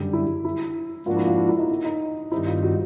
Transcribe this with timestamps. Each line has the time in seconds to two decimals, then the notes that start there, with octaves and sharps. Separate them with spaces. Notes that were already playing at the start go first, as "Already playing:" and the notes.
Already playing: F#2 D3 G3
0.13 E4
0.45 E4
1.06 G#2 F3 A#3 D4 F4 F#4
1.17 E4
1.27 F4
1.38 E4
1.49 E4
1.59 D#4
1.69 E4
1.84 D#4
2.32 G2 D#3 G3 C4 D#4 E4
2.47 F4
2.63 F#4